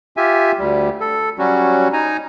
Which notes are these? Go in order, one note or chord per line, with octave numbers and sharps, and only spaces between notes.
F4 G4 E5 G#5
D2 G3
A4
F#3 G3 C#4 F#4
D#4 G#5 A#5